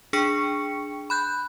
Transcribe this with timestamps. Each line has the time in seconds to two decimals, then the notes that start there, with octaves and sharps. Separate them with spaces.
0.13 D4 G#4 G5 C#6 C#7
1.10 B5 F#6 G6